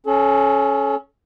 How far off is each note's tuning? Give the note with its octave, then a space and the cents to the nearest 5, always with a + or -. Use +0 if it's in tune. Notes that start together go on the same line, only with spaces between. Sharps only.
C#4 -5 A4 -35